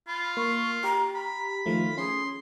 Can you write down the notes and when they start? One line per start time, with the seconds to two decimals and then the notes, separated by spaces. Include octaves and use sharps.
0.08 F4 B5
0.37 A#3 C#6
0.84 G4 A#5
1.15 A#5 B5
1.66 D#3 F3 A3 F4
1.98 C#4 G#4 C6